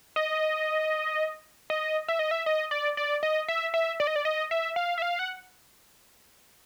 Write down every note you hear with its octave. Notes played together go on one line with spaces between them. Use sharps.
D#5
D#5
E5
D#5
E5
D#5
D5
D5
D#5
E5
E5
D5
D#5
D5
D#5
E5
F5
E5
F5
F#5